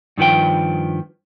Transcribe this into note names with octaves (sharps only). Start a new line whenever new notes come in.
G2 D#3 F3 B4 G5